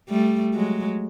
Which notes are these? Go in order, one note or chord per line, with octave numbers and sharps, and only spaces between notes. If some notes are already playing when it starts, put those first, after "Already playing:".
G3 A3
F#3 G#3